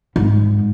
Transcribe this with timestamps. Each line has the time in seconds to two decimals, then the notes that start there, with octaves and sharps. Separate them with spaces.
0.16 G#2